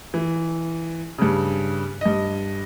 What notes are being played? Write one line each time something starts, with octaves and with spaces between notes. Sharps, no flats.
E3
G2 C#3
G2 D#5